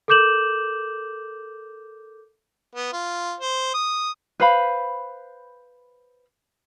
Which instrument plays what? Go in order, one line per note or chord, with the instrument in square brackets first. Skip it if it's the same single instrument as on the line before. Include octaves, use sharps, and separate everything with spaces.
[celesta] A4 A#4 D6 G6 E7 F#7
[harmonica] B3
F4
C5
D#6
[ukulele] B4 C5 F5 B5